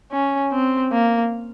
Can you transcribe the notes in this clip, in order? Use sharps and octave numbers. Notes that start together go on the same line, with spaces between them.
C#4
C4
A#3